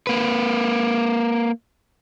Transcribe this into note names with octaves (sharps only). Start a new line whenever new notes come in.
A#3 B4